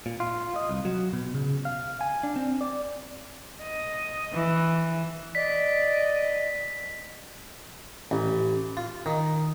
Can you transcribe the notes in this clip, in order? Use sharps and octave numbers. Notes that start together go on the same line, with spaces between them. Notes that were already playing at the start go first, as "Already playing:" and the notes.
A#2
F4
D#5
C2
F#3
B2
C#3
F5
G#5
D4
C4
D5
D#5
E3
D5 D#5 B6
A1
F4
D#3